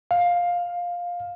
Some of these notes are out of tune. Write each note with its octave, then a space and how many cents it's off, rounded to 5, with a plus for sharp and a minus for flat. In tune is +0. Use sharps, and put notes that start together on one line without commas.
F5 +10